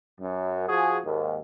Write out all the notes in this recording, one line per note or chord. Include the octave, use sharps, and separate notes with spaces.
F#2
F3 F#4 G#4
D#2 G#2